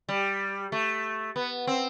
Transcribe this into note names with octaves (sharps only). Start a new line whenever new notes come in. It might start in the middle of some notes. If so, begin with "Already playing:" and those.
G3
A3
B3
C4